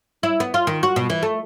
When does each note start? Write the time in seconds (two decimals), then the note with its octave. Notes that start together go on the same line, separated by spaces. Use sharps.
0.23 E4
0.40 B3
0.54 F4
0.67 D#3
0.83 F#4
0.96 B2
1.10 E3
1.23 A3